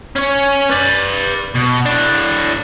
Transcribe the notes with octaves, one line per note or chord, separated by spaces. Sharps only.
C#4 C#5
B4 D5
B2
A2 D4